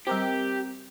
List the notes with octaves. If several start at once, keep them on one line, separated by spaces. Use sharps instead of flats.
G3 C4 G4 A#4 D6